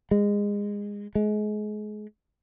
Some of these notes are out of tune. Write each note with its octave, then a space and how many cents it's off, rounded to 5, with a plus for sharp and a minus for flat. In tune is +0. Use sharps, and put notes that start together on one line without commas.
G#3 -25
G#3 +30